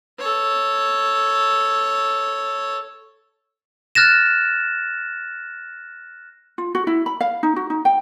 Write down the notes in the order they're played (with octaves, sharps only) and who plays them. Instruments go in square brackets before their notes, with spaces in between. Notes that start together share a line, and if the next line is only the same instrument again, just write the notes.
[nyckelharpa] A4 C#5
[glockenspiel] F6 F#6 A6 A#6 E7
[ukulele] F4
F#4
E4
B5
F5
D#4
F#4
D#4
G5